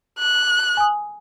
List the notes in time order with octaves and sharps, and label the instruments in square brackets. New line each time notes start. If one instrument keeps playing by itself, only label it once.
[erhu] F#6
[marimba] G#5 D#6